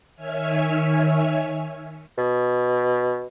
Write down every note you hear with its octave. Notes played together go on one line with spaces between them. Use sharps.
D#3 C#5 E5 G#5 F6
B2